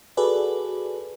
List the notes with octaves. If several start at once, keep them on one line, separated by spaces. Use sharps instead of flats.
F#4 G#4 A4 B4 D5